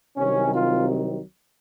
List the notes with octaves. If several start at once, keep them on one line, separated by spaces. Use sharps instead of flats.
C2 C3 D#3 F#3 C#4
F4